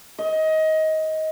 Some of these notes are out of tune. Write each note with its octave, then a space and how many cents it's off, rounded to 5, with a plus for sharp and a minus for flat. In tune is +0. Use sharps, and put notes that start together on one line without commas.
D#5 +20